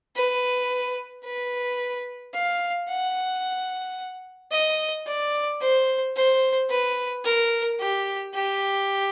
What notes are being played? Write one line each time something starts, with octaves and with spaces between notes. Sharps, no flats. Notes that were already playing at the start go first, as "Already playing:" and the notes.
B4
B4
F5
F#5
D#5
D5
C5
C5
B4
A#4
G4
G4